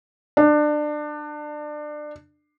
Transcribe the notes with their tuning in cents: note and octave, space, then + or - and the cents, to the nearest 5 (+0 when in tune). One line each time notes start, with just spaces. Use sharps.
D4 +25